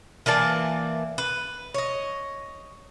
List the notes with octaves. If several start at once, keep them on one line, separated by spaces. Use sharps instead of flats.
E3 A#3 D5 A5
B4
C#5 D#5